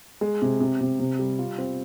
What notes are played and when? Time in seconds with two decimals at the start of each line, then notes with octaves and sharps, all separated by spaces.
0.21 G#3
0.42 C3
0.61 C3
0.81 C3
1.00 C3
1.19 G3
1.39 F4
1.58 C4